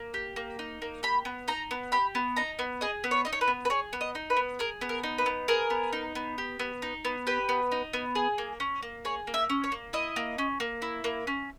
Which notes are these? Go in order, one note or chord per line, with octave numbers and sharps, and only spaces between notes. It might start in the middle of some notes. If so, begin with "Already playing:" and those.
Already playing: A#3
G4
A#3
D#4
A#3
G4 B5
B3
D#4 A#5
B3
G4 B5
B3
D#4 A#5
B3
G#4 D#5
B3
C#5
D#4 D#5
C#5
B4
B3
B4
G#4 C#5
B3
D#5
D#4
B4
B3
G#4 A#4
B3
A#4
D#4
B4
B3
G#4 A#4
B3
D#4
B3
G4
B3
D#4
B3
G4 B4
B3
D#4
B3
G#4
A#3
C#4
A#3
G#4 C#5
A#3
E5
C#4
C#5
A#3
E4 D#5
A#3
C#4
A#3
E4
A#3
C#4